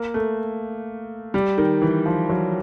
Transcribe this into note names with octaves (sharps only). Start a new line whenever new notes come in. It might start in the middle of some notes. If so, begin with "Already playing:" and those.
Already playing: A#3
A3
G3
D#3
E3
F3
F#3